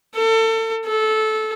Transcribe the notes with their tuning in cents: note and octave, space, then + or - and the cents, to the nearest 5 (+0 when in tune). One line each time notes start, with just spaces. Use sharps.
A4 +30
A4 -15